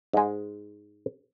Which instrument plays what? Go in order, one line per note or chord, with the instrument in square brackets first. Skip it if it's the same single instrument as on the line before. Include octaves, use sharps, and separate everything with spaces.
[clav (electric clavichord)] G#2 G#3